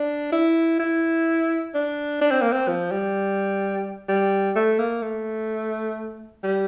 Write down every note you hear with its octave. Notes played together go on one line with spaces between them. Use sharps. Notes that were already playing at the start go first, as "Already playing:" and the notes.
Already playing: D4
E4
E4
D4
D4
C4
A#3
C4
F3
G3
G3
A3
A#3
A3
G3